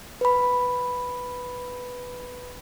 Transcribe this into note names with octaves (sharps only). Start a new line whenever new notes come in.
B4 B5